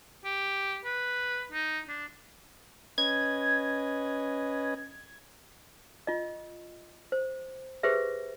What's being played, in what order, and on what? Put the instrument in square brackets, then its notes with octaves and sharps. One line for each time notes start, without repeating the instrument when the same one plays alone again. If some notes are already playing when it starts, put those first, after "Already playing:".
[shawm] G4
B4
D#4
D4
[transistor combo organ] C#4 B4 D#5 [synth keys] G#6
[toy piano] F4 D#5
C5
G4 G#4 B4 C5 E5